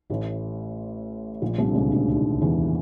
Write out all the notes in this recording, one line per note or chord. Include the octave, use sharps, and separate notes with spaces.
A1 A2
A#1 A#2
C2 C3
D3
C#2 C#3
D2 D3
D#2 D#3
E2 E3